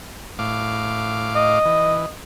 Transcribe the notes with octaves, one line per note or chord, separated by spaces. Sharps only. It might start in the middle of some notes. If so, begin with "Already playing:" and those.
A2 F5 D6
D#5
E3